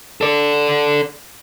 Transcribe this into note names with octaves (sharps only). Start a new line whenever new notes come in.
A4 D5